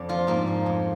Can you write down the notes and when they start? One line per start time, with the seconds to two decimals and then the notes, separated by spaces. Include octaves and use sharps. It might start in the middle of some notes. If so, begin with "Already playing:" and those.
Already playing: F2 D5
0.09 F3 F4
0.27 G#2 A#3
0.47 F3
0.66 F2